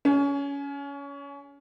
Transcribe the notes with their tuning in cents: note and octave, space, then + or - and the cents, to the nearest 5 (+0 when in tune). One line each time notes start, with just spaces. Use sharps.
C#4 +25 G#4 +0